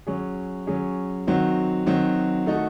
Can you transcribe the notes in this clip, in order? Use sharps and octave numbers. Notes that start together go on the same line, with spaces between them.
F#3 C#4 G#4
F#3 C#4 G#4
D#3 F#3 C4 F#4
D#3 F#3 C4 F#4
D#3 A3 D#4 F#4 A4